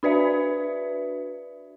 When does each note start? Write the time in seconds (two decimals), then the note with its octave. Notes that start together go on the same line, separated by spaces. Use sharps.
0.03 D4 F#4 B4 D5 E5